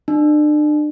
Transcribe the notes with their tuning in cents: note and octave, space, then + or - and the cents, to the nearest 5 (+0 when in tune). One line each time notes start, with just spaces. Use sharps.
D4 +35